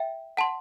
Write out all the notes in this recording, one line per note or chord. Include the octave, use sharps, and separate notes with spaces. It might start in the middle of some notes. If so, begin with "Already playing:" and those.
Already playing: E5 G5
F#5 A5 C6